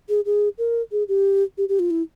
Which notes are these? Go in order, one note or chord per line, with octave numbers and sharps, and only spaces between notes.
G#4
G#4
A#4
G#4
G4
G4
G4
F4
E4